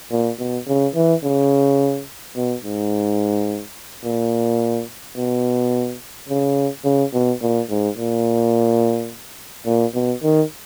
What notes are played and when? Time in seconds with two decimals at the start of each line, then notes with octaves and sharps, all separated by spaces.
0.11 A#2
0.39 B2
0.68 C#3
0.95 E3
1.23 C#3
2.36 B2
2.64 G#2
4.04 A#2
5.16 B2
6.29 C#3
6.85 C#3
7.13 B2
7.42 A#2
7.70 G#2
7.97 A#2
9.66 A#2
9.94 B2
10.23 D#3